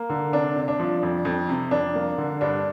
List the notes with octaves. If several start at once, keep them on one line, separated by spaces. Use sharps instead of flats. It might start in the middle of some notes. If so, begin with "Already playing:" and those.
Already playing: A#3
D3
C3 D4
C3
D4
F3
F2
F2
C3
F2 D4
A#3
D3
G2 D4